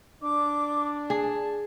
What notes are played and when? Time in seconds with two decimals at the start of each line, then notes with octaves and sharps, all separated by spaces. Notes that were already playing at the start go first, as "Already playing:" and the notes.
0.22 D4 D6
1.10 G#4 A5